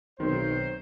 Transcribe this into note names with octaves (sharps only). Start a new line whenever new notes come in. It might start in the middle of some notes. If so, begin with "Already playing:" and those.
B1 D#3 C4 C5